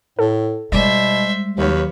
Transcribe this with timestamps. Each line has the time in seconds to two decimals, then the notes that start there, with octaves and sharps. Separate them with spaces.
0.19 A2 A4
0.72 B2 G3 G#3 C5 D5 E5
1.58 D#2 D#3 F#3 B4 C#5